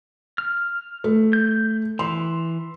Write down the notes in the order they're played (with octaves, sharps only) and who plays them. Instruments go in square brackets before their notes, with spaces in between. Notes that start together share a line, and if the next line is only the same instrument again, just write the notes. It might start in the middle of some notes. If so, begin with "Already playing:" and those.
[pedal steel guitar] F6
[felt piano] A3
[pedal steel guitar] G6
[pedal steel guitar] E3 [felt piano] C6